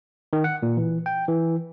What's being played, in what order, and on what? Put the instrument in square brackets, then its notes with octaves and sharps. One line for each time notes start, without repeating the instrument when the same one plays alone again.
[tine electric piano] D#3
F#5
A#2
E3
G5
E3